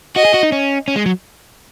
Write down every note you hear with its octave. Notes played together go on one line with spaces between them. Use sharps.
F#4 D#5
G#4
F#4
D#4
C#4
C#4
G#3
F#3